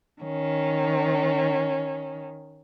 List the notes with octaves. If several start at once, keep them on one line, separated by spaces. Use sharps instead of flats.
D#3 C#4